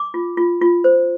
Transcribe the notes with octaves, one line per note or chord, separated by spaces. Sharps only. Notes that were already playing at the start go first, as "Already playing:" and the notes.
Already playing: D6
F4
F4
F4
C5